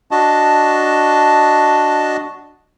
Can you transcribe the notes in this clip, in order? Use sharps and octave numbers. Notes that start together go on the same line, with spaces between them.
D4 F#4 D#5 A5